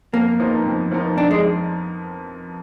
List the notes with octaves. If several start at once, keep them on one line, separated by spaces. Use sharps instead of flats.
F2 A#3
F3 B3 D#4 A#4
F2
F3 B3 D#4 A#4
F2 D4
G#3